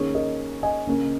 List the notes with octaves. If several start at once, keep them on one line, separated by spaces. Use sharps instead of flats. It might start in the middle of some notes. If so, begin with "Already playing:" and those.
Already playing: D#3 A#3 C#4 G#4 C#5
A#4 D#5
D#5 G#5
C#3 A#3 C#4